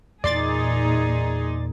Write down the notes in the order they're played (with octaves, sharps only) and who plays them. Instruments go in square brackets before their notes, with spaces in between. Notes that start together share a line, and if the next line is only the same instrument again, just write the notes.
[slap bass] E2 A#3 [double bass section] A#2 [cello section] D#4 G#4 [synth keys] D5 C6 A6